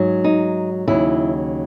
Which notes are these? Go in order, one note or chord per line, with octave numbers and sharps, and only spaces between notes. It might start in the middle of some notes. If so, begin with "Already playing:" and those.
Already playing: G#2 F#3
D#4
D#2 C#3 F#3 E4